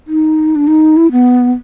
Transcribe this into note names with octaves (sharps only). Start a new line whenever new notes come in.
D#4
D4
D#4
E4
B3